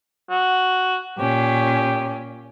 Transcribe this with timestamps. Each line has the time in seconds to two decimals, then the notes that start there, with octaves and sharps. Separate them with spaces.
0.31 F#4
1.18 A#2 C#4 G4